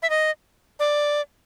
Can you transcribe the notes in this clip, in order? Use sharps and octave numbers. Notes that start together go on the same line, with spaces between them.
E5
D#5
D5